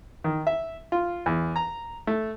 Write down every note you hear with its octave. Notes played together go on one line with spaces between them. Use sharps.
D#3
E5
F4
E2
A#5
A3